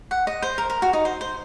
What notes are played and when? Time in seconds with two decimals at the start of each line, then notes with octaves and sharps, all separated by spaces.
0.11 F#5
0.27 D#5
0.42 C5
0.58 A#4
0.70 A#4
0.82 F#4
0.93 D#4
1.05 C5
1.21 C5